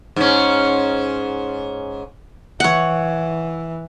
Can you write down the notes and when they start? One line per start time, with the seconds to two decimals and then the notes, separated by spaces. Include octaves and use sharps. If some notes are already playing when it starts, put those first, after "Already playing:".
0.16 G#2 C#4
2.60 E3 E4 C#5 F#5